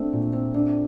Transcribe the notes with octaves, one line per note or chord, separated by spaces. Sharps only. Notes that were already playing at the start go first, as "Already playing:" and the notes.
Already playing: A3 C4 D4
A#2
C4
C4 D4